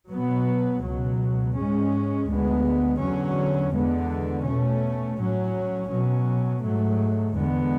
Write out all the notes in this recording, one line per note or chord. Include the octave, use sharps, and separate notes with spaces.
B2 F#3 B3
C#2 B2 F#3
G#2 G#3 C#4
D2 D3 G#3 B3
E2 D3 F#3 C#4
E2 D3 G#3 B3
B2 A3 C#4
A2 F#3 C#4
B2 F#3 C#4
G#2 F#3 A3
E2 D3 G#3 B3